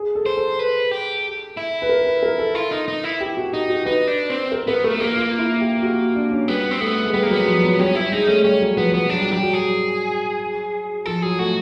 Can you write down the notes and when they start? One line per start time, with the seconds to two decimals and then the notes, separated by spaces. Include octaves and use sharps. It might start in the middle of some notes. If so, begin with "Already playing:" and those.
Already playing: G#4
0.15 A4
0.26 C5
0.37 A4
0.59 B4
0.91 G4
1.57 E4
1.82 B4
1.89 A#4
2.06 B4
2.23 A#4
2.39 A4
2.55 F4
2.72 D#4
2.88 D#4
3.04 E4
3.21 G4
3.37 F#4
3.53 D#4 G4
3.70 F#4
3.85 D#4 B4
4.07 D4
4.30 C4
4.52 A#4
4.67 B3 A#4
4.84 A3 A#4
5.00 A#3 A#4
5.17 F4
5.39 E4
5.61 G4
5.83 F#4
6.15 D4
6.31 C#4
6.48 G3 B3
6.71 C4
6.80 A3 B3
7.05 G#3
7.14 G3 B3
7.23 A#3
7.30 F#3 B3
7.46 F3
7.62 F#3
7.79 G3 C#4
7.95 G3 E4
8.12 G#3 D#4
8.27 A3 C#4
8.44 G3 C#4
8.61 F#3
8.77 F3 B3
8.94 F3 B3
9.09 F#3 D4
9.21 G3
9.31 F#3 G4
9.43 F#3
9.53 G#4
11.06 F3 A4
11.22 F#3 G#4
11.39 A3 F#4